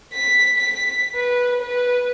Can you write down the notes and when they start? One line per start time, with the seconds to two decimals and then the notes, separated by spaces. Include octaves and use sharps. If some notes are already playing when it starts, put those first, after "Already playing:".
0.13 B6
0.57 B6
1.15 B4
1.61 B4